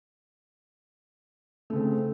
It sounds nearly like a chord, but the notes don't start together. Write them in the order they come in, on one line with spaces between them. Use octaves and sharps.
A3 C#3 C4